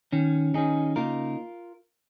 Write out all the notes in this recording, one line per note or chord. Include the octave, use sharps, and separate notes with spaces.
D#3 C#4
D#3 C#4 D#4 G#4
C#3 A#3 D#4 F4 A#4